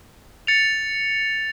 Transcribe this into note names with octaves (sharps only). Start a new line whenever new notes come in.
A6 C#7 F7